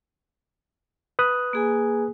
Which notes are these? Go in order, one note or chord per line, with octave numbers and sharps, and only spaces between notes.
B4 D#6 F#6
A#3 G#4 G#5